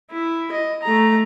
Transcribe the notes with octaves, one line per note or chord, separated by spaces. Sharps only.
E4
D#5
A3 A#5